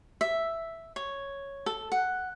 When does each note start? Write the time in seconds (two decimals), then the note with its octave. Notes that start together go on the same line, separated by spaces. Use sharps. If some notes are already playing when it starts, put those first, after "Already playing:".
0.21 E5
0.96 C#5
1.66 A4
1.92 F#5